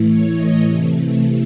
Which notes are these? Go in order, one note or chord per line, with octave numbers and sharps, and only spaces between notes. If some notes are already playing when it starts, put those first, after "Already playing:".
Already playing: A2 E3 A3
C#5
D#5
C3 E3 A3